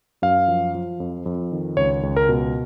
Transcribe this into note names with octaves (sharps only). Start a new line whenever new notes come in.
F#2 F5
F3
F3
F2
F2
D#3
C#2 C#5
C#2
A#4
B2